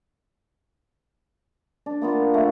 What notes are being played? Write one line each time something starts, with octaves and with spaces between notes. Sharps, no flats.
D4
A#3 B3 F4
A3